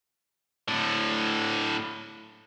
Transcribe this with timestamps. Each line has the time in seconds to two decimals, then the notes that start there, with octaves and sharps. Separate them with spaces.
0.68 A2 D3